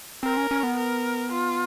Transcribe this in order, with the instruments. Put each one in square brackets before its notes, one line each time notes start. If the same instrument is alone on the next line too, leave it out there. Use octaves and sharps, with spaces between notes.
[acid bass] C4 [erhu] A#4
[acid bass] C#4
C#4
B3
[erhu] A#4
F4